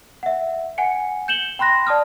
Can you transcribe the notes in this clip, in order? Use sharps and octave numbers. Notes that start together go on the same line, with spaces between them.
E5 F#5
F#5 G#5 C#7
G6 C#7 E7 F#7 G7
G5 B5 C6 F#6 A#6
D5 A5 D#6 F6